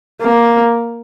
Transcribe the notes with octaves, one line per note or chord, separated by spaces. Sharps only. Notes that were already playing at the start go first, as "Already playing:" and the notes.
A#3